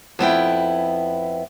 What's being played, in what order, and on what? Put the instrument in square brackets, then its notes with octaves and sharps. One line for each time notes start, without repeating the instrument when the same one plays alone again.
[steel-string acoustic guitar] F2 B3 E4 G5